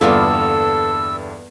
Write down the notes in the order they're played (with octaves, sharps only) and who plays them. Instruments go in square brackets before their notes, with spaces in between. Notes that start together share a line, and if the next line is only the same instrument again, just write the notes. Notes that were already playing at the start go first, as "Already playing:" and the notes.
[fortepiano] E2 G2 D3 [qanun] A#3 B3 F4 [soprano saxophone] A4 [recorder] E6